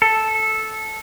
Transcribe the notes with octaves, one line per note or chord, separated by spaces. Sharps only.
A4